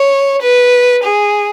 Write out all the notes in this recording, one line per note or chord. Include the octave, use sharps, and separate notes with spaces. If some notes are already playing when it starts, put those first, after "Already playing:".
Already playing: C#5
B4
G#4